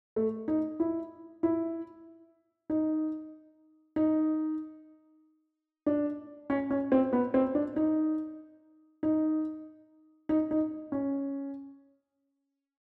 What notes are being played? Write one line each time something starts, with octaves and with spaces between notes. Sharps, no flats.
A3
D#4
E4
E4
D#4
D#4
D4
C#4
C#4
C4
B3
C4
D4
D#4
D#4
D#4
D#4
C#4